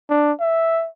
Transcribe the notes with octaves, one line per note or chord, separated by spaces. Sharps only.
D4
E5